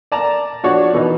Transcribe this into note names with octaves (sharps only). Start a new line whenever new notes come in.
D5 A5 A#5
F3 D4 F#4 C#5 D5
B2 E3 D#4